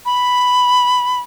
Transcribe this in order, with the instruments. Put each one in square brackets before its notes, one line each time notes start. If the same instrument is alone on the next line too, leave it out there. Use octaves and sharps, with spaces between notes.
[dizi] B5